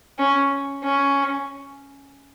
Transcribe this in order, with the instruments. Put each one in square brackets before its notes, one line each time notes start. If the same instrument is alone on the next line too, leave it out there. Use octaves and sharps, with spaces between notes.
[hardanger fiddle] C#4
C#4